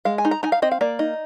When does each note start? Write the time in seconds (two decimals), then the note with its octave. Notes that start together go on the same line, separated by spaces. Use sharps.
0.05 G#3 F5
0.18 G#5
0.25 D#4
0.31 A#5
0.43 D#4 G#5
0.52 F5
0.62 C4 D#5
0.71 F5
0.81 A#3 D5
0.99 D#4